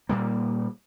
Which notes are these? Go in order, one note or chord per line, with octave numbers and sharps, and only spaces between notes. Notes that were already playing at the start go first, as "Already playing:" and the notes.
A#2 G3 A#3